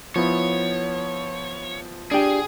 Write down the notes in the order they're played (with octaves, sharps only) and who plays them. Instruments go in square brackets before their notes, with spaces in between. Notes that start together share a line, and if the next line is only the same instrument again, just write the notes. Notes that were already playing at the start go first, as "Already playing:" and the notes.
[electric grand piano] F3 B3 E4 [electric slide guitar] C#5
[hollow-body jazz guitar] D4 G4 [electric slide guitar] G#4